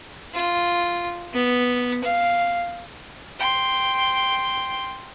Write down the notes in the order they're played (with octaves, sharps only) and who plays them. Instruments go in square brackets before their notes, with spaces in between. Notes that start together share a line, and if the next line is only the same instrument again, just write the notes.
[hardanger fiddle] F4
B3
F5
[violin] G5 C6